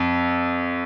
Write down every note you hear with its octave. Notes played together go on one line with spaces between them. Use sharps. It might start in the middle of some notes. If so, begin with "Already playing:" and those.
Already playing: F2